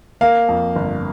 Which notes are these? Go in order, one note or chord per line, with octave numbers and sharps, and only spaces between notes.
A#3 F5
F2
G1